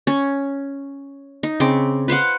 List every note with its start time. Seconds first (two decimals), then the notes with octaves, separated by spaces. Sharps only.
0.07 C#4
1.43 D#4
1.60 C#3 C4 D6
2.08 B4 C5 F5 F#5